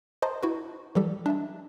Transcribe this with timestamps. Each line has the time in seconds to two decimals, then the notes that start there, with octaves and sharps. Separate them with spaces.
0.22 B4 C5 D#5 A5 A#5 C6
0.42 E4 F#4 B4
0.95 E3 F#3 G3 G4 A4
1.26 D4 D#5 E5 A5